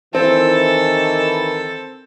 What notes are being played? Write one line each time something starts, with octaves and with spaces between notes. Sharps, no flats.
D#3 E3 C4 A4